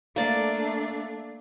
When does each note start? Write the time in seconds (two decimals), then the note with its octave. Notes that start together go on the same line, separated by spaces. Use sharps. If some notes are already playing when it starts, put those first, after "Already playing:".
0.16 A3 A#3 D4 D5